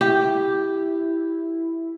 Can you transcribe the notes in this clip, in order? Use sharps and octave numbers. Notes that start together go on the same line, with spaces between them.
E4 G4